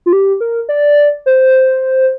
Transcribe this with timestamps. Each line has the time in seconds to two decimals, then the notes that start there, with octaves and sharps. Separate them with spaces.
0.06 F4
0.13 G4
0.41 A#4
0.69 D5
1.26 C5